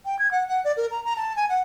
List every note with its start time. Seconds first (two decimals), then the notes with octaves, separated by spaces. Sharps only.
0.05 G5
0.19 G#6
0.32 F#5
0.48 F#5
0.64 D5
0.77 A#4
0.91 A#5
1.05 A#5
1.17 A5
1.36 G#5
1.49 F#5